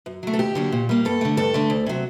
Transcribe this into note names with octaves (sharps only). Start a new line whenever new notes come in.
F#2
F#3 A3
A4
D#2 G4
D3 F#3 A#3
A#2
G3 A#3
G2 A4
D3 A3
G2 A4
D3 A3
D2
C3 F#3